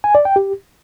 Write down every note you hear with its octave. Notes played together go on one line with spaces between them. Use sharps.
G#5
D5
G5
G4